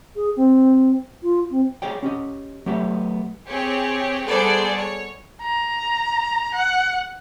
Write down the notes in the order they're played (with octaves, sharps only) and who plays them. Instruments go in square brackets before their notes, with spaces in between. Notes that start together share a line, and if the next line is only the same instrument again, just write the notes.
[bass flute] G#4
C4
F4
C4
[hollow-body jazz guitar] G#4 C#5 D5 G5
C#4 G4 D#5
F#3 A3 B3 G4 E5
[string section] C4 G4 G#4 C#5
G3 B3 G#4 A4 C5 D5
C#5
[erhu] A#5
F#5